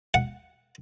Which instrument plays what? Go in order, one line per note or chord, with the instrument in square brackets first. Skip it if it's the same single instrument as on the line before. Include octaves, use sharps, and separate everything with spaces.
[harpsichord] F#5